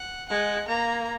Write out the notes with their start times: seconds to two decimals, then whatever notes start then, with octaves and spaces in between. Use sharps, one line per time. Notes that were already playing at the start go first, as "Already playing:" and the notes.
Already playing: F#5
0.29 G#3 F#5
0.67 A#3 A#5